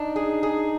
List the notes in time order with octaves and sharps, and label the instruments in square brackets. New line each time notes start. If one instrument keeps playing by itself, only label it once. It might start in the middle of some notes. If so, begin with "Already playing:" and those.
Already playing: [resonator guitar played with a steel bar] D4 [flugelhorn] D#4
[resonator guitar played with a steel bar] G#4
G#4